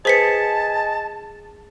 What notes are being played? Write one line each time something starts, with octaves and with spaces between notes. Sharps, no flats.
G#4 B4 C5 D#5 G#5 A5 B6 C#7